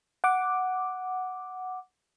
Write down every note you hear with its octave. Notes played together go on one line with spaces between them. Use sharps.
F#5 D6